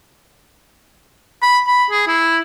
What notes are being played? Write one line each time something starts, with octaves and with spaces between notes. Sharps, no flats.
B5
B5
G#4
E4